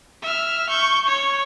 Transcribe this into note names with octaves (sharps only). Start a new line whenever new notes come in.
E5 F6
C#6 G6
C#5